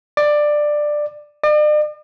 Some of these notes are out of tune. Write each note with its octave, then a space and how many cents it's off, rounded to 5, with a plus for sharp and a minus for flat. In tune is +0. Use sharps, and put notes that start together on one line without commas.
D5 +15
D5 +45